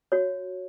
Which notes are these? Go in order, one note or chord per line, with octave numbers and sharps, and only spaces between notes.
F#4 C#5